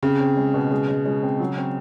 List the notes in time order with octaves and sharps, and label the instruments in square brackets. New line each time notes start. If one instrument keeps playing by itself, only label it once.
[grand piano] C#3 [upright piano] C4
[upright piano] C4
G#3
B2
G#3
G#3
G#3
C4
F#3
C4